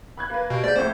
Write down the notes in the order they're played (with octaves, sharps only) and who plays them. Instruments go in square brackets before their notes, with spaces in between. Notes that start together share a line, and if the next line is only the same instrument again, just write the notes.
[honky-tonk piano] B5 F#6 G#6
A#3 B4
[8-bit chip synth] B2 [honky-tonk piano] G4 D7
[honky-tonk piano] G#2 C5 [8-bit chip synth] D5 G6
[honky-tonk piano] F2 A2 A3 [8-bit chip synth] C5